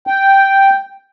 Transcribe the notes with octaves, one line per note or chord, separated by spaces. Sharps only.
G5